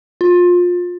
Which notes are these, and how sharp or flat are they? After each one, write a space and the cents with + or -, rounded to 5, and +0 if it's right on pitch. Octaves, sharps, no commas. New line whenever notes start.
F4 +25